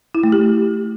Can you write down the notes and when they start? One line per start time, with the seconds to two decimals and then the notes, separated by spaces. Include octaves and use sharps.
0.15 E4
0.23 A3
0.32 G4